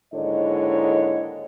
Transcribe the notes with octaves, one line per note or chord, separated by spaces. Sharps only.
D#2 G#2 D3 E4 C#5 D#5